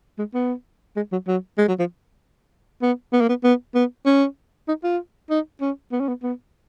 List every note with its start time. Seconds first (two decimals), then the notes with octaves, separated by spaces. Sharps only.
0.19 G#3
0.34 B3
0.96 G#3
1.12 F#3
1.27 F#3
1.58 G#3
1.68 F#3
1.79 F3
2.82 B3
3.13 B3
3.21 A#3
3.29 B3
3.44 B3
3.75 B3
4.06 C#4
4.68 D#4
4.83 F4
5.30 D#4
5.61 C#4
5.92 B3
6.00 C#4
6.08 B3
6.23 B3